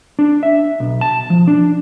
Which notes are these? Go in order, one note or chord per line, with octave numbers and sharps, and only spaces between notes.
D4
E5
B1
A5
F3
D4